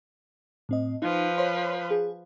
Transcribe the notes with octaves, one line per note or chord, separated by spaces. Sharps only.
A2 C4 D#5
F3 D#4 B4
C5 C#5 C6
G#4